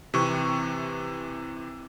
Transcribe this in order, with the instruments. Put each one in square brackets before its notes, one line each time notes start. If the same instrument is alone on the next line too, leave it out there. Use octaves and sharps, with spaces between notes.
[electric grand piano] C3 E3 C#6